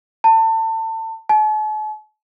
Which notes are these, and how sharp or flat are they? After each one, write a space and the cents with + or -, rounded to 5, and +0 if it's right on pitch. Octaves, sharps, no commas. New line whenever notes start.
A5 +30
A5 -45